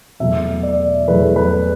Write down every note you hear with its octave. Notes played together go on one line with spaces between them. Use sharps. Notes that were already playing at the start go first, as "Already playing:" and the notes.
E2 B2 F#3 A3 E5
D5
E2 B2 F#3 A3 B4
B4